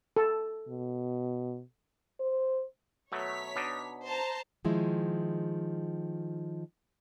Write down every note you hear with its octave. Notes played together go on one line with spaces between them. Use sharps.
A4
B2
C5
B2 F#3 A3 C#5 B6
B2 D4 D#4
C5 A5 A#5
D#3 F3 G#3 E4